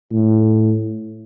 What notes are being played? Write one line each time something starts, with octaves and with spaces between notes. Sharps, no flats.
A2